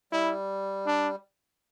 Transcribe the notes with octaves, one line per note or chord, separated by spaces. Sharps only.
G3 E4
D4